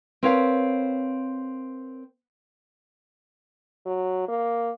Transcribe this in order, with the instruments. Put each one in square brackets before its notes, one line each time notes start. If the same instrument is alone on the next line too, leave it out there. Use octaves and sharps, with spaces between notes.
[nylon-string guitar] C4 A#4 B4 C#5 D5 F5
[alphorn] F#3
A#3